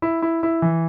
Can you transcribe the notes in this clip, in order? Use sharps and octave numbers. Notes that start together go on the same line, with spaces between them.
E4
E4
E4
E3